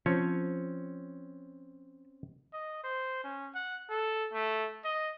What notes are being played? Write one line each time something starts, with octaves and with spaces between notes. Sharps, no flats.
F3 C4 C#4 C#5
D#5
C5
C#4
F#5
A4
A3
D#5